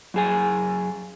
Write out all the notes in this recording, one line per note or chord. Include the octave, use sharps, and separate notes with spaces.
F#2 G#4 G#5